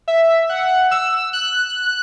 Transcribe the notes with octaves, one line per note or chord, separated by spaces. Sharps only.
E5
F#5
E6
F#6